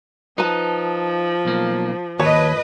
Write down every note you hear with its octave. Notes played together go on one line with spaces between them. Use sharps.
F3 D#4 B4 A5
B1 A#3
D#2 B4 C#5 D#5 A5